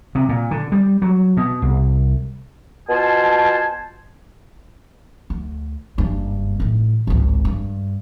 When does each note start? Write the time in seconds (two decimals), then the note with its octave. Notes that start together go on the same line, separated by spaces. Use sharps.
0.15 C3
0.29 A#2
0.51 D3
0.72 G3
1.02 F#3
1.37 B2
1.62 C2
2.89 B2 F4 C5 G#5 A5
5.30 D2
5.98 F#1 G2
6.60 A1 D#3
7.07 G#1 C#2
7.45 G2